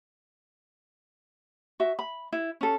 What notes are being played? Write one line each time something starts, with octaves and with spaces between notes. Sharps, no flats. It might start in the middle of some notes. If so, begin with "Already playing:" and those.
F#4 E5
B5
E4
C#4 A4